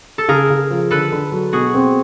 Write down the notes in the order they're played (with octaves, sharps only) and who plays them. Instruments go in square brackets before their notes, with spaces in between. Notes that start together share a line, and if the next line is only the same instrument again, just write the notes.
[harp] A4
[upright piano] C#3 [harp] G#4 A#4
[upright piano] C#3
F3
[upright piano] D3 [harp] A4 B4
[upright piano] D3
F#3
[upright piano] B2 [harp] F#4 G#4
[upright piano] C4